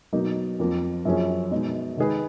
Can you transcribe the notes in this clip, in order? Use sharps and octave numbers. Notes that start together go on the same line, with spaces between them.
B2 F#3 A#3 D#4
F2 F3 A#3
F#2 F3 A#3 C#4 G#4
B2 G#3 D#4
D#3 G#3 D#4 G#4 B4